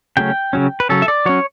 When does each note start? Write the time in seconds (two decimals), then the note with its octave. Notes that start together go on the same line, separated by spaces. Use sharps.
0.17 C#3 F#3 A3 C#4 G5
0.53 C#3 F#3 C#4
0.80 B4
0.89 C#3 F#3 C#4 A4
1.02 E5
1.08 D5
1.26 F#3 C#4 C#5